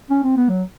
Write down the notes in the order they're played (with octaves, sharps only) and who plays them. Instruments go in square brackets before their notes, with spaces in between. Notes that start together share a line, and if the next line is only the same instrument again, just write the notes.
[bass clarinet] C#4
C4
B3
F#3